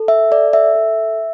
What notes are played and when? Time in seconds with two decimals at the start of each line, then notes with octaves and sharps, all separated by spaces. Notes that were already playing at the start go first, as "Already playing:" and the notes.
Already playing: A4
0.08 E5
0.31 A4 D5
0.53 E5
0.75 A4